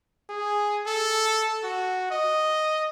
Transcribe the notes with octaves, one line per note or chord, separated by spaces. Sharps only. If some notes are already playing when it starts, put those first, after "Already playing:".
G#4
A4
F#4
D#5